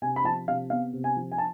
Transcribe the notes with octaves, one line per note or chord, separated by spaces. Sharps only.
C3 G#5
B5
F3 A5
C3 F5
B3 F5
C3
G#5
F3
G#5
A5